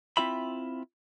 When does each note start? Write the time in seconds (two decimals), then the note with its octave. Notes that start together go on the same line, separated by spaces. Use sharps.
0.17 C4 E4 F4 E5 B5